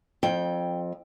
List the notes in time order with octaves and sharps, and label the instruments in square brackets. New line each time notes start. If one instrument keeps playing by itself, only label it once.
[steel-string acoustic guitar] F2 [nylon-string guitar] G5